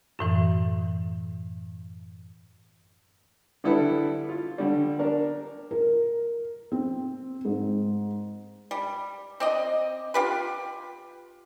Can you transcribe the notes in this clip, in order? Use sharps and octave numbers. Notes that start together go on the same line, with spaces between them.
F#2 A2 E3
D3 G3 E4 A4 B4
F4
D3 G3
D4 A#4
A#4
C4
G#2
G3
C4 D5 D#5
F4 G4 B4